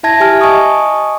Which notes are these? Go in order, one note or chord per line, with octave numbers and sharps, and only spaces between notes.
E4 E5 A5 G#6 A#6
G4 E5 G#5 A5 F6
D#5 G#5 A5 C#6 D#6